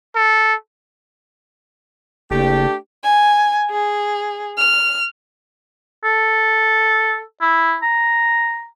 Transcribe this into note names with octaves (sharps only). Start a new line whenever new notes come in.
A4
F#1 A3 D4 G4
G#5
G#4
F6
A4
E4
A#5